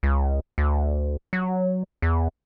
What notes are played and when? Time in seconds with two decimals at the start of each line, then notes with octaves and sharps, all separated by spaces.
0.03 C#2
0.58 D2
1.33 F#3
2.02 E2